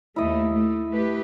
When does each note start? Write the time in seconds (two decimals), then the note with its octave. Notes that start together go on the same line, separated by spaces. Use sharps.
0.16 D#2 A3 E4 D#5
0.53 A3
0.91 A3 G4 B4